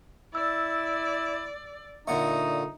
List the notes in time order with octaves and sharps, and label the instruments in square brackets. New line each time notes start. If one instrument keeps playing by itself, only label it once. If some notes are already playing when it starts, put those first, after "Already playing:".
[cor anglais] E4 [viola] D5 [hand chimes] E6
[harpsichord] A#2 D3 C#6 [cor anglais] D#4 [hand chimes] E5